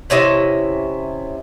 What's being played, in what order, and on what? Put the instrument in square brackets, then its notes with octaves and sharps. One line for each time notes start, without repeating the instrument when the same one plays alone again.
[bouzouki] C3 C#4 E4 D#5